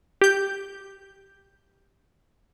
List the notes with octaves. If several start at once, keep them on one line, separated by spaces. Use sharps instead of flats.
G4 G6